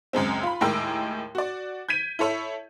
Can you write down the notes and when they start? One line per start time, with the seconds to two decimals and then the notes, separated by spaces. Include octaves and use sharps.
0.13 C#2 F#2 G#3 C4
0.43 F4 B5
0.61 D#2 A2 G#3 A#4 G5 E6
1.35 F#4 D5
1.89 G6 G#6 B6 D#7
2.19 E4 A4 C#5 E5